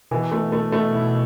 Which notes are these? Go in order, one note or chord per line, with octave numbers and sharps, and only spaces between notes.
B2 E3
A3
A3
A3
E4